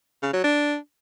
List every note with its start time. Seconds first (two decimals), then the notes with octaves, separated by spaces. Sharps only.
0.22 C#3
0.33 F#3
0.44 D4